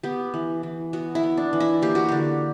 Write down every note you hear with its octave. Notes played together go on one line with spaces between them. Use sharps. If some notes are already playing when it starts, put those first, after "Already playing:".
B3 G4
E3
E3
B3 F#4
E4
B3
D4
E3
E4
A#3 G4
F#4
D3 G4